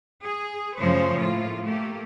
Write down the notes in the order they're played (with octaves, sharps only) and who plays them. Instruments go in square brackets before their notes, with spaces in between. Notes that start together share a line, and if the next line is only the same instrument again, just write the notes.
[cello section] G#4
F#2 C#3 F3 A3 C5 C#5
A2 A#3 F4
A3 A#3 G4